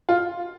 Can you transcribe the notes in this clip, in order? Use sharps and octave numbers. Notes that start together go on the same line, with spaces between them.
F4